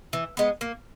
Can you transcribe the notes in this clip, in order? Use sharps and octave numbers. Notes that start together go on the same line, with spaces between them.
E3
G#3 B3
A#3